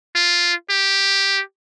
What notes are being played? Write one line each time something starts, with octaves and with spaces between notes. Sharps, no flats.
F4
G4